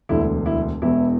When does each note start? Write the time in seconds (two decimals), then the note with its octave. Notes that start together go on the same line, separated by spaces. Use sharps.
0.09 E1 D2 D3 E4
0.46 E4
0.82 E1 E2 E3 E4